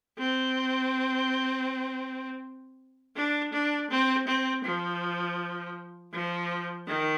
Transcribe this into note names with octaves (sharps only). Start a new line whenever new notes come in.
C4
D4
D4
C4
C4
F3
F3
D#3